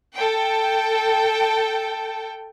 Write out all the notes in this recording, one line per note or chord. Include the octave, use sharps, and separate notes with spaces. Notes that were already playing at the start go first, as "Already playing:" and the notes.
A4 G5